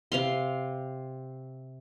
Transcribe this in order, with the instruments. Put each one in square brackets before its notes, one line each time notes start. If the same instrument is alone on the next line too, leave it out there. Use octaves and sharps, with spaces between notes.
[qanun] C3 F5 C6